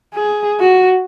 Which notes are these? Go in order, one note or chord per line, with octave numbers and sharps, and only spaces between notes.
G#4
F#4